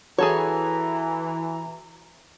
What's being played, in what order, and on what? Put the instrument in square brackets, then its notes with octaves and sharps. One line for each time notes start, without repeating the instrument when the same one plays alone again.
[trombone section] E3 [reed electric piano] F#4 [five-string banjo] G#4 A4 C#5 [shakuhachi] A#5